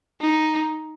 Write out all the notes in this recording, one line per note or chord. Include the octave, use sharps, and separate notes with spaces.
D#4